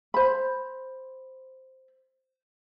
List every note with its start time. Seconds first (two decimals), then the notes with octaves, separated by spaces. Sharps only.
0.14 C5 B5